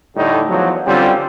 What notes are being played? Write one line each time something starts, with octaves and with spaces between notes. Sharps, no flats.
A2 D3 G3 D#4 G4
E2 F3 F#3
D3 G3 C4 C#4 F4